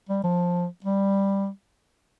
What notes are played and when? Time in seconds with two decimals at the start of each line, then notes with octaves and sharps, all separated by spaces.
0.09 G3
0.23 F3
0.84 G3